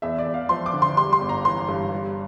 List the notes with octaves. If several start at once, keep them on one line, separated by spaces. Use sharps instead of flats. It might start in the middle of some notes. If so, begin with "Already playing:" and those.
E2 E5
D5
E2
F5
F3 C6
D6
D3
C6
G3 C6
C6
G1
A#5
E3 C6
G2
G3